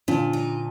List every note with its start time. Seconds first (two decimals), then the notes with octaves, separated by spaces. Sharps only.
0.08 A#2 D3 F3
0.33 D#4